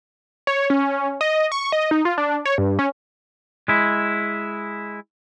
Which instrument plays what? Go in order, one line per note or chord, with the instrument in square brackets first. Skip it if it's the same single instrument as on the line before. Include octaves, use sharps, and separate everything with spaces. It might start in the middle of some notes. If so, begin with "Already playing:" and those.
[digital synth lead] C#5
C#4
D#5
C#6
D#5
D#4
F4
D4
C#5
G2
C#4
[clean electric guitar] G#3 E4